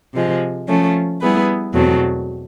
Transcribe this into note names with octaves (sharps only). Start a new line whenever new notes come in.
C3 F3 G#3
F3 A3 C#4
G3 B3 E4 G#4 B4
E2 B2 F#3 A3 C4